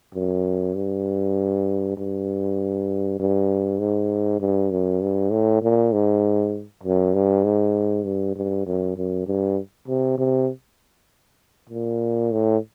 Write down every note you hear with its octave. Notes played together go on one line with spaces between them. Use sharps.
F#2
G2
G2
G2
G#2
G2
F#2
G2
A2
A#2
G#2
F#2
G2
G#2
G2
G2
F#2
F#2
G2
C3
C3
A#2
A2